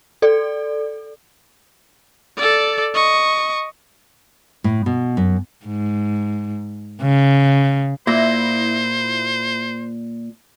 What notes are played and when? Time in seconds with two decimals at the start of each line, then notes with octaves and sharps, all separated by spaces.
0.22 A4 D5
2.37 A4 D5
2.94 D#5 C#6
4.64 A2
4.86 B2
5.17 F#2
5.66 G#2
7.01 C#3
8.07 A#2 E4 C5 A#6